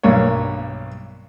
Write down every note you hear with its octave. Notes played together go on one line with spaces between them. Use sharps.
B1 G2 A#3 C#5